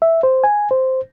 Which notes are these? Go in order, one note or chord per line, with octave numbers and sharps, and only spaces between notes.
E5
C5
G#5
C5